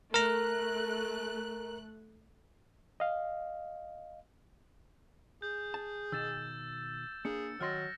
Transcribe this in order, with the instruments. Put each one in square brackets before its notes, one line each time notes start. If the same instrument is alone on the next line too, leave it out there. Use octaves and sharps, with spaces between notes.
[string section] A3 F#6 [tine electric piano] A#4 A#5
[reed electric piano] D#5 F5
[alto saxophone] G#4 [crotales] G6
[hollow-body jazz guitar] A5
[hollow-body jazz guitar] B2 D#3 [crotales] E6 A6 E7
[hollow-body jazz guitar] A#3 D4 [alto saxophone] G#4 [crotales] C#7
[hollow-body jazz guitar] D#3 C6 [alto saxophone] F#3 [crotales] F6 A6 A#6